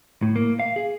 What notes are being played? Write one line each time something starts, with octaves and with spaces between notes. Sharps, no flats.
A2
A#3
F5
G#4